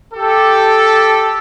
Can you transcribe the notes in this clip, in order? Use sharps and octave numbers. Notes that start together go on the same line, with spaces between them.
G4 A4